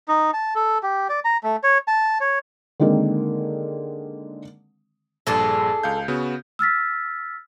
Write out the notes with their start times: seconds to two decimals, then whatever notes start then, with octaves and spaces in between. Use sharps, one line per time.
0.08 D#4
0.34 A5
0.55 A4
0.83 G4
1.09 D5
1.25 A#5
1.43 A3
1.63 C#5
1.88 A5
2.21 C#5
2.80 D3 D#3 G#3 A#3 C4
5.27 A#1 G2 D4 G#4 A4
5.83 C#2 F5 G6
6.08 C#3 B3 F#4
6.59 E6 F6 A6 B6